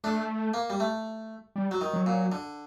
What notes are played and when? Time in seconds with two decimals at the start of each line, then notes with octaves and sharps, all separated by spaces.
0.04 A3 D4
0.54 A#3
0.70 G3
0.80 A3
1.56 G3
1.71 F#3
1.81 D#3
1.93 F#3
2.06 A#2
2.32 D3